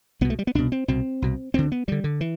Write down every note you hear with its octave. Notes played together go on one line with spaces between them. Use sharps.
C2 B2 B3
A3
G3
B3
C2 B2 D4
C4
C2 B2 C4
C2 B2
D2 D3 C4
B3
D2 D3 G3
D3
E3